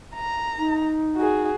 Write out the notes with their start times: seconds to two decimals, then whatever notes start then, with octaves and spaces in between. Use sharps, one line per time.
0.15 A#5
0.58 D#4
1.17 F#4 G#4